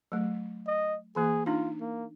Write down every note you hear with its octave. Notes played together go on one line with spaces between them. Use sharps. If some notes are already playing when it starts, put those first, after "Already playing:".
F#3 A3
D#5
E3 A#3 G#4
D4 D#4 F4
A#3